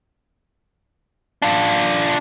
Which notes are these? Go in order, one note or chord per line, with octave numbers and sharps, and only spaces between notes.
D4 F4